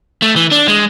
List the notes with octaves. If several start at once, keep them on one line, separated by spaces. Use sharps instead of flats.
A3
E3
D4
G#3